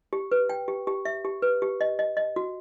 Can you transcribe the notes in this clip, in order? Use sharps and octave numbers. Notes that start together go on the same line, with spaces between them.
G4
B4
G5
G4
G4
E5
G4
B4
G4
D#5
D#5
D#5
F#4